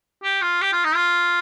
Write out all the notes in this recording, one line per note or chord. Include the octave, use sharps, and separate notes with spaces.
G4
F4
G4
F4
D#4
F4